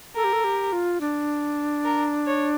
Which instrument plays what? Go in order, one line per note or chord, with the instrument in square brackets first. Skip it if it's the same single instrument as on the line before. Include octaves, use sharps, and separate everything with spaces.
[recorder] A4 [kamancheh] A#4
[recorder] G4
A4
G4
F4
D4
[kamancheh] A#4
C#5